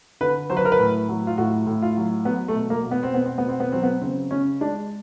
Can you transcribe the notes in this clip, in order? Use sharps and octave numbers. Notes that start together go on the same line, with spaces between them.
D3 B4
F#3 C5
B4
A#4
B4
A2
F#3
F4
A2 F#4
A2
F4
F#3
F#3 B3
A3
B2
A#3
B2
B3
C4
B2 B3
C4
B2 B3
C4
B3
F#3 C4
B3
C#3 C4
C#3 C#4
G#3 D4